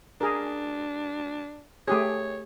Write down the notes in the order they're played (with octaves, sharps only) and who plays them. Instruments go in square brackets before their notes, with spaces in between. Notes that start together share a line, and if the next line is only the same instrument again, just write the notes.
[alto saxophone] D4 [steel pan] G#4 A#4
[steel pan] A3 G4 G#4 [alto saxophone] C#5